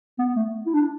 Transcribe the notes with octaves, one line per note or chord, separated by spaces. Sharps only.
B3
A3
E4
D4